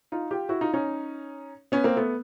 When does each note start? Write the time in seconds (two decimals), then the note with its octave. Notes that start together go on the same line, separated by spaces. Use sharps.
0.12 D#4 F4
0.31 F4 G4
0.49 E4 F#4
0.61 D#4 F4
0.74 C#4 D#4
1.72 B3 C#4
1.84 A#3 C4
1.96 A3 B3